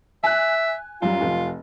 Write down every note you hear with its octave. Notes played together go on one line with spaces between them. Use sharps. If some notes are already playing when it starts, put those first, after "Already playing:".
E5 G#5 F#6
F#2 G3 F4
F1